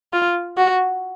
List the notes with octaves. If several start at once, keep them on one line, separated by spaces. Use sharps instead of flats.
F4
F#4